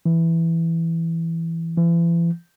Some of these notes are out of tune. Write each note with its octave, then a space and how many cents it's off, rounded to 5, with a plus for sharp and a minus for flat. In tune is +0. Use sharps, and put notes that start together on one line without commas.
E3 +5
E3 +40